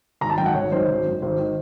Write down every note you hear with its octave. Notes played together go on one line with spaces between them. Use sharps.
G#1 A#5
A5
F#2 D#3 G5
F#5
G#1 C#5
F#2 D#3 C5
G#1
F#2 D#3
G#1 C5
D#3